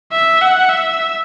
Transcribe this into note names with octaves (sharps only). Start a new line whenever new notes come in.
E5
F#5
E5